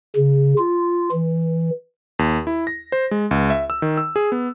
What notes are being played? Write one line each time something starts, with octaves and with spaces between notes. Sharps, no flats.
C#3
F4
E3
D#2
E4
A#6
C5
G#3
C#2
E5
E6
D#3
E6
G#4
B3